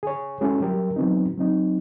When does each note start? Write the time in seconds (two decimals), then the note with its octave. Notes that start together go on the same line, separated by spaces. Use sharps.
0.03 G#4 C#5
0.41 G#3 C#4 E4 F#4 G#4 A4
0.61 F#3 G3 G4 A#4
0.96 E3 F#3 B3 C4 D#4
1.38 F#3 C4 D#4